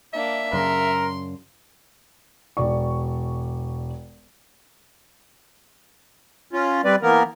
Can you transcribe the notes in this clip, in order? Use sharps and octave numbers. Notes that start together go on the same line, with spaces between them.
A#3 D4 E5
F#2 C#3 A#4 C6
E1 D5 C#6
C#4 F4
G3 C4 B4 D5
E3 A#3 B3 A#4